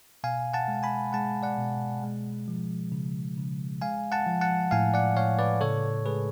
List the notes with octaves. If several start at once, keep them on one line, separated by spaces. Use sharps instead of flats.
B2 F5 G#5
F#5 A5
G#3
G#5 B5
G#3 F#5 A5
D5 F#5
B2
G#3
F3
C#3
C#3
G#3 F5 G#5
F#5 A5
F3
F#5 A5
A2 F5 G#5
D5 F#5
A2 C#5 F5
B4 D5
C#3 A4 C#5
G#3 G#4 B4